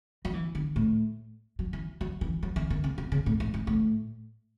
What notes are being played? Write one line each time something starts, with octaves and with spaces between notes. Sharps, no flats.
F#3
E3
D#3
A2
F#3
E3
F#3
E3
F#3
E3
D#3
C#3
B2
C#3
A2
G#2
G#2
A2